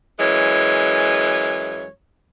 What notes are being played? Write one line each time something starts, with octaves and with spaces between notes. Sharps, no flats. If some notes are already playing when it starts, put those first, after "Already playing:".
F#2 E3 G#3 C#5